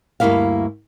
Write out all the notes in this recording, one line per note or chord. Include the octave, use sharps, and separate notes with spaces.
D2 G2 D#3 A#3 E4 F5